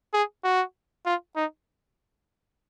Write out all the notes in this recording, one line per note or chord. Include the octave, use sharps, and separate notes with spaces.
G#4
F#4
F4
D#4